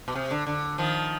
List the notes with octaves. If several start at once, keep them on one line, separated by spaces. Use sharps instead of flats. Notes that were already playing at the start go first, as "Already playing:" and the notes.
B2
C3
D3
D3
D#3 F3